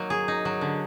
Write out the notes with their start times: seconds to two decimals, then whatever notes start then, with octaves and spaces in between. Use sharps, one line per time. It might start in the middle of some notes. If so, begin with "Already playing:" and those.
Already playing: F#3 A#3 D#4
0.10 G#4
0.28 D#4
0.45 F#3
0.61 D3